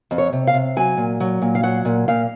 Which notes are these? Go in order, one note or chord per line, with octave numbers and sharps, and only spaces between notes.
F2
C#5
C3
F5
C3
F#3 G#5
A#2
F#3
A#2
F5
F#3 F#5
A#2
A#2 F5